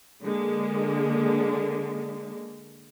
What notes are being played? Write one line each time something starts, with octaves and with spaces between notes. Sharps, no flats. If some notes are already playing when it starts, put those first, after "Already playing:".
D3 G#3 A#3